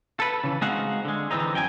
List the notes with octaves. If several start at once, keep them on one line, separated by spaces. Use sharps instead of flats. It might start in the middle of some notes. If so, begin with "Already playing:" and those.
A4 B4
C#3 E3
G#3 C4 D#4 F#4 F5 F#5
D3 G#3
D3 E3 A3 C4 D#4
F#2 G5 G#5